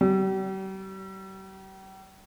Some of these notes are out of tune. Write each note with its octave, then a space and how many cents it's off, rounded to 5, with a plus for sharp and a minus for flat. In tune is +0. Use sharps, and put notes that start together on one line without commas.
G3 -40